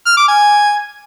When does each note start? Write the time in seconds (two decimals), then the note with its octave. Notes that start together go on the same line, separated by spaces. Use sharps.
0.06 F6
0.17 D6
0.28 G#5